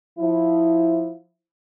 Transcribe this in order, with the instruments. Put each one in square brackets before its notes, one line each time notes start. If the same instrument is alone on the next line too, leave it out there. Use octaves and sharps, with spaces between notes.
[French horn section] F3 E4